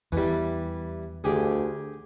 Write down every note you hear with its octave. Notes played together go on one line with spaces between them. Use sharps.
E2 E3 G3
D2 G4 G#4